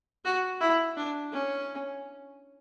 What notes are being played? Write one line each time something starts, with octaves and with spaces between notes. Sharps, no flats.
F#4
E4
D4
C#4